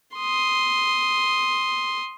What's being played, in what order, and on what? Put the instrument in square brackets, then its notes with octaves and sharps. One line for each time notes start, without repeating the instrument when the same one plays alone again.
[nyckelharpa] C6 D#6